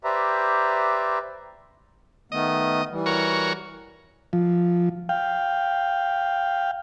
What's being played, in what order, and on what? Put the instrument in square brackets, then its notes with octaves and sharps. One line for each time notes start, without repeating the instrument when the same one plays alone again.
[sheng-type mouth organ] G4 B4 C5 D5 E5 A#5
[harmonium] D#3 A3 B3 [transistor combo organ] D#5
[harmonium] E3 G3
[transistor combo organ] F#4 A#4 C#5
F3
F5 G5